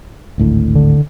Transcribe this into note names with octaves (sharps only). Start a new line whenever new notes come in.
G#1 D2 A2
D3